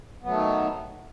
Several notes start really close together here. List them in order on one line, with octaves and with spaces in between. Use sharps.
B3 F#3 A3 D#3